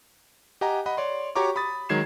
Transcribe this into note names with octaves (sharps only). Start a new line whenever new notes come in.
G4 D#5 F#5 G#5 A#5
D#5 F#5 B5
C#5 D5 C6
F#4 G4 C#5 A#5 C#6 D6
B5 D#6 A6
D#3 F#3 G#3 G#6 C7 E7